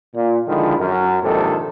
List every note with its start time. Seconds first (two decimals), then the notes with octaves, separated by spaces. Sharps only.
0.15 A#2
0.47 D3 D#3 F3 G#3 E4
0.79 F#2
1.23 A#1 G#2 C3 D#3 A4